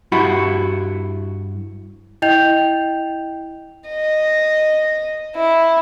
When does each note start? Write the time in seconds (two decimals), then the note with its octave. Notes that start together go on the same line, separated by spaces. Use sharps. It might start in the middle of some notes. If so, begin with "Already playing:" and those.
0.12 G2 E4 F#4 B5
2.22 E4 D#5 G5 G6 F7
3.89 D#5
5.35 E4